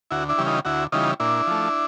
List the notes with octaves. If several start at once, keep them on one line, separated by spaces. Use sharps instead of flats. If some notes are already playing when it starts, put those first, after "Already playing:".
D2 E4 F#4
D4 E4
C#3 E3 G3
D#4 F4
D2 E4 F#4
C#3 E3 G3 D#4 F4
A#2 D4 E4
F3 A3